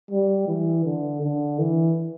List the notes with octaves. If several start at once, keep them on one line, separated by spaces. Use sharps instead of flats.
G3
E3
D3
D3
E3